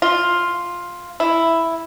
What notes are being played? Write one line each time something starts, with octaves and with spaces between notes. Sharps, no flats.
F4
E4